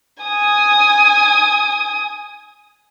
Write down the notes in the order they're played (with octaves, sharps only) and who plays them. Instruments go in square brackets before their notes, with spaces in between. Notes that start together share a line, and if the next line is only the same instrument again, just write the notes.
[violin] G#5 D#6